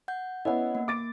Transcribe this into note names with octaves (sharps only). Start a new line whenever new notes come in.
F#5 G6
B3 C#4 E4 D#5 F#5
A#3
D6 A6 D7